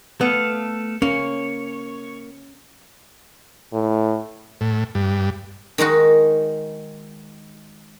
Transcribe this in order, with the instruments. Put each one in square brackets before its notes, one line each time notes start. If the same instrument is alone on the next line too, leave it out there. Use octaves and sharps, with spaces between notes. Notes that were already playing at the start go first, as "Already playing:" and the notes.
[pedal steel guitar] A3 A4 F5 [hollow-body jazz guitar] B3
[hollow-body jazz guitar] A#3 [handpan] C#4 [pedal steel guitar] C#5
[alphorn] A2
[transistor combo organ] A2
G2
[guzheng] D#3 G#3 D#4 F#4